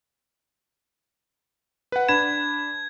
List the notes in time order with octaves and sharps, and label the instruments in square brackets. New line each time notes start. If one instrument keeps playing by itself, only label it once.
[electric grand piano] B4 F#5
[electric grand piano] D4 B5 E7 [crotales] G#6